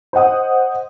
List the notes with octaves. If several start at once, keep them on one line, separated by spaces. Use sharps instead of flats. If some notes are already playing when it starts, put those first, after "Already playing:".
C5 D#5 F#5 D#6